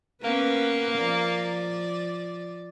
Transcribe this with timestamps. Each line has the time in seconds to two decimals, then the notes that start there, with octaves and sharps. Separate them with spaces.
0.23 A#3 B3 C#4 B4
0.96 F3 D5